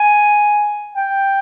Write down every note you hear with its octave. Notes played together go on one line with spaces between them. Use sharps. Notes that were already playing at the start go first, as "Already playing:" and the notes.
Already playing: G#5
G5